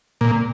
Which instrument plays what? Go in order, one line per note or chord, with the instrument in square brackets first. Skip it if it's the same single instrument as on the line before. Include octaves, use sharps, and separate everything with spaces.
[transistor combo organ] A#2